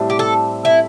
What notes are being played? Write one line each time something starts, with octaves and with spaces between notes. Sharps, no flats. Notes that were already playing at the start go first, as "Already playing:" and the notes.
Already playing: A2 G3 C4
G4
A4
E4